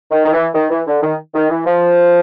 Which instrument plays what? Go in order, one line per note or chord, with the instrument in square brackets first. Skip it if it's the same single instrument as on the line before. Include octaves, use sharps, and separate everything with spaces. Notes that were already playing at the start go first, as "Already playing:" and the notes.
[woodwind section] D#3
D#3
E3
D#3
E3
D3
D#3
D#3
E3
F3